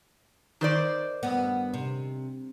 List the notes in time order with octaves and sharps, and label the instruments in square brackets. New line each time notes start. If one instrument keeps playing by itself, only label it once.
[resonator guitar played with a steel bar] D#3 C5 D5
[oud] G2 B3
C3